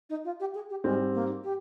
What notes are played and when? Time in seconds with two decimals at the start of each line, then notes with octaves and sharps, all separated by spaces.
0.10 D#4
0.24 F4
0.40 G4
0.55 G#4
0.70 G4
0.84 G#2 G3 G#3 C4
1.14 A#3
1.44 G4